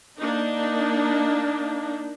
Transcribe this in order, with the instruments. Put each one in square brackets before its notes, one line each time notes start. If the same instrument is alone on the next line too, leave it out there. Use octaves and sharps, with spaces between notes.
[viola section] A#3 D4 D#4